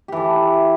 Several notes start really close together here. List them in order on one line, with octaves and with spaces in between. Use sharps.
G4 E3 A4